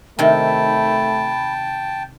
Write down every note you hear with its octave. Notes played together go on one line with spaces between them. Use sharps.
C3 D#3 A3 G5 A5 B5